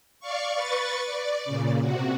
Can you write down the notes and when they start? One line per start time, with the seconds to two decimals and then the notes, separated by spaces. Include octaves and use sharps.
0.20 D5 F5 C#6
0.53 B4 C#6 A6
1.05 D5
1.45 A#2 C#3
1.81 C3 F#4